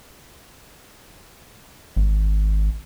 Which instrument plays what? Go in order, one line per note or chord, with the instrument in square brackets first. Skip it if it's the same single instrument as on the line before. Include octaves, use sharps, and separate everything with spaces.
[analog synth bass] G#1